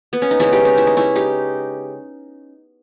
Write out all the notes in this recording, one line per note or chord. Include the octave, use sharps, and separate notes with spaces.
B3
C#4
D#4
C#3 G#3 B3 C#4 E4
D#4 G4
C#4
E4
D#4
C#4 E4
D#4 G4